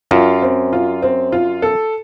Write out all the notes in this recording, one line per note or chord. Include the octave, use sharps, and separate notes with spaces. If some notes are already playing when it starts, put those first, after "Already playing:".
F#2 F4
C4
F4
C4
F4
A4